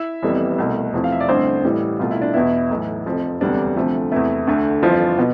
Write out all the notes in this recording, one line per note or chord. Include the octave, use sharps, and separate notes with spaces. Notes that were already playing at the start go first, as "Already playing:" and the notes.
Already playing: E4 E5
F1 F2 E3 G3 B3
C2 B2 A3
E2 C3 F3 A3
F5
E5
D5
A1 G2 D3 A3 C4 C5
A1 A2 E3 G3
C2 B2 A3 F4
E4
D4
E2 B2 B3 E4
B1 A2 E3
F1 F2 C3 F3
E1 D2 C3 G3 B3 D4
D2 C3 F3 A3
E2 C3 E3 A3 E4
D2 D3 A3
G1 F2 E3 F3 F4
B2 B3